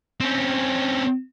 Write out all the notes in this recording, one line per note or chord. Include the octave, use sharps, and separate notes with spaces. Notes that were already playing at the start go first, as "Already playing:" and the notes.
C4 C#4